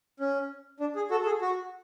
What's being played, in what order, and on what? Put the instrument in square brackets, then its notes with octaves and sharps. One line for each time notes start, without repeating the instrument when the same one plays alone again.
[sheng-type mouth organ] C#4
D4
G#4
F#4 A4
A4
G#4
F#4